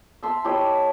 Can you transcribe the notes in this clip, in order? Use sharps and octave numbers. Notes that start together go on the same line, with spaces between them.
E5 A5 C6 E6
E4 G4 C#5 D#5